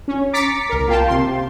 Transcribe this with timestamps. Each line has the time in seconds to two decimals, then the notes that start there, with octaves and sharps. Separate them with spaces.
0.08 C#4
0.33 A#5 D6 A6 B6 C#7
0.70 C2 A#4
0.88 A#3 F4 G5 A5
1.08 C3 C6